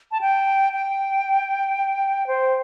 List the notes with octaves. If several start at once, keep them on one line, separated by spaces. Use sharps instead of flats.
A5
G5
G5
C5